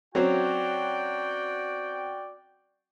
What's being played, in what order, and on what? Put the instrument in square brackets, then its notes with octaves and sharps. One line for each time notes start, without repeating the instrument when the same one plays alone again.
[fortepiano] F#3 C4 C#4 [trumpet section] F#4 D5 G5